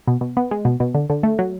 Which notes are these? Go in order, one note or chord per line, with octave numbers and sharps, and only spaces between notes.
B2
B2
B3
G#3
B2
B2
D3
D3
A3
F#3